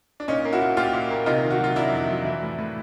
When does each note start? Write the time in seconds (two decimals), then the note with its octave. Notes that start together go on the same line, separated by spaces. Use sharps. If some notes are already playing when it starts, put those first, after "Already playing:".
0.20 D4
0.28 A#2 C#4 D#4
0.45 A#3
0.52 E4 F#4
0.61 A#2
0.77 A#2 F4 G4
0.93 A#2
1.10 A#3
1.26 C3 D#4 F4
1.43 D#3
1.50 F#4
1.59 F#3 F4
1.76 F#3 D4 E4
1.92 F2
2.09 F#3
2.25 E3
2.42 A2
2.58 A2